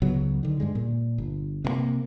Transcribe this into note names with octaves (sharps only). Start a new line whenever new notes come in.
C#2 C#3 F#3 B3
D3 D#3
G2 G3 G#3
A#2
G1
C3 F#3 A#3